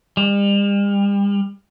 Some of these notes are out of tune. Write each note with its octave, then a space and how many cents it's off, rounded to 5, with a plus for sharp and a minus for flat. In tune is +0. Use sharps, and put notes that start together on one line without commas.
G3 +40